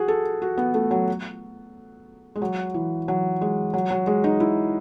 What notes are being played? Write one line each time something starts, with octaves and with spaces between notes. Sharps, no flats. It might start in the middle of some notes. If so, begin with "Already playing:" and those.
Already playing: F#4 G#4
A4
F#4
B3
A3
F#3
G#3
F#3
E3
F#3
G#3
F#3
F#3
G#3
D#4
E4